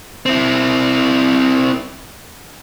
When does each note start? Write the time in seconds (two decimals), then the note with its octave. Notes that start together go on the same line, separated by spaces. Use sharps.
0.26 C4 E4